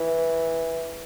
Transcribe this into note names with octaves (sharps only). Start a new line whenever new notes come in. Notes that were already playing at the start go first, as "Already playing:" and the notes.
Already playing: E3